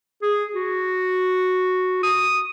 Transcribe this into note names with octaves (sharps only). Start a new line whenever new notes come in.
G#4
F#4
D#6